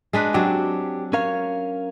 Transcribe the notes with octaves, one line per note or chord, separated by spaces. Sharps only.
G#3 D4 B4
F#3 C4 D4 G4
C#4 A#4 C#5 F5